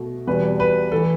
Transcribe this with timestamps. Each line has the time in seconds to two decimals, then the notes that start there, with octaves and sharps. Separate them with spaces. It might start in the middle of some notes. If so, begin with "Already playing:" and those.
Already playing: B2 A3
0.27 E2 B2 G3 B4
0.60 B4
0.92 E3 A3 A4